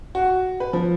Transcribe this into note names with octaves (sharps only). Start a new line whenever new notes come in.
F#4
B4
F3